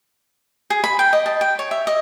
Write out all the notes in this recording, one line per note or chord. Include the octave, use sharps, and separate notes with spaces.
G#4
B5
G5
D#5
A5
G5
C#5
E5
D#5